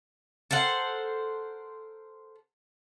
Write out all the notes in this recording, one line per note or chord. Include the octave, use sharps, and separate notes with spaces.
A4 A#4 C5 F#5